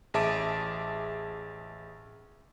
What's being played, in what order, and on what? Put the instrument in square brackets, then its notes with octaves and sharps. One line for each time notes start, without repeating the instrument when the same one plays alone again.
[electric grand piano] A1 G#4 E5 A5 D6 D7